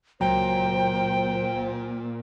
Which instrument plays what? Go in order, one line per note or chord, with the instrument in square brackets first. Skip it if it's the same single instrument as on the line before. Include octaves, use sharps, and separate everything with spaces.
[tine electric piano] C#2 F#3 A#5 [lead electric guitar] A#2 [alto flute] C5 [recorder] G5